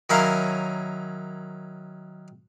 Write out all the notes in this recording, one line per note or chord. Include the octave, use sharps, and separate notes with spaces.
D#3 F#3 C#4 E4 A#4 F5